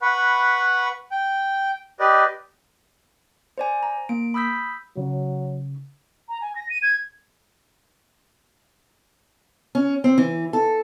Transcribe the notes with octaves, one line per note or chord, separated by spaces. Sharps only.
B4 F#5 B5 C#6
G5
G4 B4 D5 D#5
C5 D5 G#5
A#5
A#3 D7
B5 D#6 E6 G6 B6
C#3 F#3
A#5
G#5
A#6
D#7
G#6
C#4
C4
E3
A4